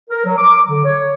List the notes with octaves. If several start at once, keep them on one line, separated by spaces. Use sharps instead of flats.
A#4
F#3
D6
D3
C#5